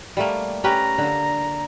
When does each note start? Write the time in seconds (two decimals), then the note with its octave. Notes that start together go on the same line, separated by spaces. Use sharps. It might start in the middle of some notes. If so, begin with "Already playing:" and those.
0.17 G3 A3 A#3
0.64 C#4 G4 B4 A#5
0.98 D3 A#3